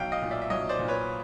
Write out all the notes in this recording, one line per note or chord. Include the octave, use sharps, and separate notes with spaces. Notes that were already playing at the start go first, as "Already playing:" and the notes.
Already playing: B1 F5 G5
D#5 F5
A#2
D5 E5
E5
B1 C#5 D#5
C5 D5
A#2
B4 C#5